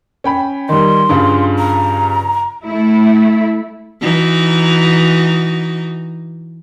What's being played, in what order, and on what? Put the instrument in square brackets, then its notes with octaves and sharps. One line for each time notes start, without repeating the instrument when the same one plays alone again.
[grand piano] C#4 G5 B5
[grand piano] D#3 G3 [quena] C6
[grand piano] G2 C#3 F4
[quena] A#5
[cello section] A3 E4
[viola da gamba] E3 D#4 F#4